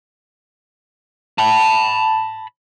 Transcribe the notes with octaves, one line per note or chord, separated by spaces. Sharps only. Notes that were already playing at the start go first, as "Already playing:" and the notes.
A5 B5